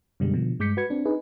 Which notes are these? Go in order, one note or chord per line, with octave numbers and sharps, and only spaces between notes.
F#2 B2 D3 G3 G#3
B2 D3 F3
G2 G#3 D6 G6 B6 C#7
F#4 B4 G#6 C#7
C4 D4
D#4 G#4 B4